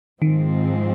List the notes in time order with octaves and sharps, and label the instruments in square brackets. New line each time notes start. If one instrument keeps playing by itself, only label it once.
[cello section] G#2 F3 G#3 C4 [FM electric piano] D#3